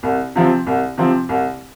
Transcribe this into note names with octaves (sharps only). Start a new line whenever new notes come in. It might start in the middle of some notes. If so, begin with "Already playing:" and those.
C2
C3 F3 C4
C2
C3 F3 C4
C2